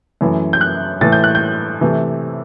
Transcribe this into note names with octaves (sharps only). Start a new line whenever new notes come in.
F#2 E3 A3 E4
G6
F#6
A2 E3 A3 A6
G6
F#6
G6
C3 E3 A3